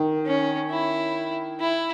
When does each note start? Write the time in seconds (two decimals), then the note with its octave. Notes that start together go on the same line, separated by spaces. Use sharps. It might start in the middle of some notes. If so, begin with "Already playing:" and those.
Already playing: D#3
0.26 C#4
0.70 E4
1.60 E4